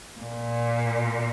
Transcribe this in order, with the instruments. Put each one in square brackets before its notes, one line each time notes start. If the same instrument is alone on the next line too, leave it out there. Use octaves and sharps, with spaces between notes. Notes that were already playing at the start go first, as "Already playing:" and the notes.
[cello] A#2